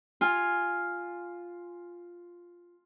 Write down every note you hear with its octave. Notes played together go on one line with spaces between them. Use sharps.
F4 G#5 F6